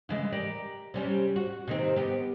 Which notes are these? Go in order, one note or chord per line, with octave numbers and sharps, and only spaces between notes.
C#3 E3 G#3
G4 A#4 D5
C3 G3 C#4
F#4
C3 D#3 C4
B3 G4